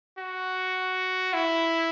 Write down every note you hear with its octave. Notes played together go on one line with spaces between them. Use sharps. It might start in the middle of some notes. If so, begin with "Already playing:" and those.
F#4
E4